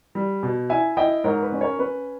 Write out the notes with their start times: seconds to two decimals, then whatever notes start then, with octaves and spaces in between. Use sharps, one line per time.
0.15 G3
0.43 B2
0.70 E4 E5 G#5
0.97 E4 D#5 G5
1.24 G#2 A#4 C#5
1.42 B4
1.52 C#4
1.61 A#4 C#5
1.79 C#4 B4